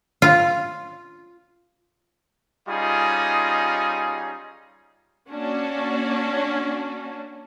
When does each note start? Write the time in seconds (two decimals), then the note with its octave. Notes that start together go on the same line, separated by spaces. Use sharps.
0.22 F4
2.68 G3 C#4 D#4 F4 G#4 D#5
5.31 A#3 C#4 D4 F#4